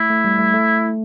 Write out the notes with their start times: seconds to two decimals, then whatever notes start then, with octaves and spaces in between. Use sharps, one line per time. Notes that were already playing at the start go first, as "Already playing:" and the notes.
Already playing: A3 E4
0.10 A3
0.25 G3
0.39 A3
0.54 A3